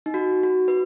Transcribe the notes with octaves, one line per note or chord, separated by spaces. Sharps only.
D#4
F#4
F#4
B4